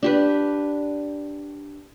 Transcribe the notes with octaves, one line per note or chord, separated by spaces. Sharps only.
D4 G4 B4